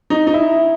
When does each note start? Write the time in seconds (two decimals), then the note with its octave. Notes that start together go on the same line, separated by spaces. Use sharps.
0.10 D#4
0.27 D#4
0.34 E4